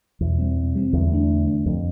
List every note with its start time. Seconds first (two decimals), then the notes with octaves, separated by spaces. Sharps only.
0.21 E2 B2
0.39 G3 C4
0.57 B2
0.75 G3 C4
0.93 E2 D3
1.12 A3 D4
1.30 D3
1.47 A3 D4
1.66 F2 C3